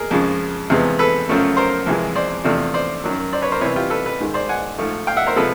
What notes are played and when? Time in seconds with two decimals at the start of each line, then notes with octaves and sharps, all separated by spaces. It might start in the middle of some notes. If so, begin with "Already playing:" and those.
Already playing: G#4 A#4
0.11 F2 C#3 F3 G#3
0.70 E2 C3 F3 G#3 B3
0.99 A4 B4
1.29 F#2 C#3 F3 A3
1.57 A#4 C5
1.86 F2 C3 E3 G#3
2.16 C5 D5
2.44 E2 C3 F3 A3 D4
2.74 C5 D5
3.04 F#2 D#3 F#3
3.33 C5 D5
3.42 B4 C#5
3.52 A#4 C5
3.61 C3 E3 G3 B3 E4 B4 C#5
3.76 F4 G4
3.90 A4 B4
4.06 A4 B4
4.20 G#2 D#3 G#3
4.34 C5 D5
4.49 F#5 G#5
4.78 G#2 F3 A3
5.07 F5 G5
5.17 E5 F#5
5.27 A#4 C5
5.36 C3 F3 G#3 A4 B4